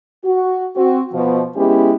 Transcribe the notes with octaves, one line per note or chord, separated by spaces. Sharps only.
F#4
C4 F#4
B2 F3
G#3 B3 C#4 E4 G4